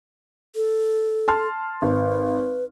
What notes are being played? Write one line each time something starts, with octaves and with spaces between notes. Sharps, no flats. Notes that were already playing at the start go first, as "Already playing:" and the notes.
A4
A5 C6 F6
G#1 B4